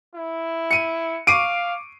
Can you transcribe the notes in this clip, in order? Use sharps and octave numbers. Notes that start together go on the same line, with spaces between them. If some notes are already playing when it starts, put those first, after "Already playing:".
E4
C#7 D#7
F5 C#6 D6 C7 D7 D#7